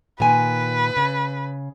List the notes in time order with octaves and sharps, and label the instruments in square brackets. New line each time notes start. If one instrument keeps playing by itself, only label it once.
[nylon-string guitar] A#2 D#3 G#5 [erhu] B4
[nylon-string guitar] C#3